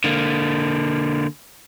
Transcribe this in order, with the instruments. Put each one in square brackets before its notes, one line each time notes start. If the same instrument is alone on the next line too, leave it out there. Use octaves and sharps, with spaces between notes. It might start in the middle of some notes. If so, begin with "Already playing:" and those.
[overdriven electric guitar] D3 A#3